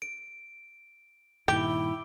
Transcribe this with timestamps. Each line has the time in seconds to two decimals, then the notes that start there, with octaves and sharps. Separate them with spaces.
0.02 D7
1.48 G2 A#2 D#3 E4 G4 D6 D7 G7